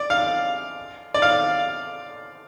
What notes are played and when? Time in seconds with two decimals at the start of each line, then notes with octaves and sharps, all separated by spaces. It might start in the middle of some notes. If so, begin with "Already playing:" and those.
Already playing: D5
0.10 F5
1.14 D5
1.22 F5